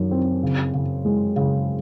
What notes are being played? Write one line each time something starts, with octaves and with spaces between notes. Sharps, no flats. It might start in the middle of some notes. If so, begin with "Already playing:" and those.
Already playing: F#2 D#3
C4
C#3
C#3
G#3
C#3